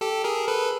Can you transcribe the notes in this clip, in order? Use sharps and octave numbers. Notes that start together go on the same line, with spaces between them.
G4 A4
G#4 A#4
A4 B4